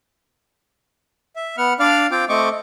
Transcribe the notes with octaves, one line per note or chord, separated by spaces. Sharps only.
E5
B3 F#5 F6
D4 D5 F5 F6
C4 F4 G5 D6
A3 C4 D#5 C#6 D6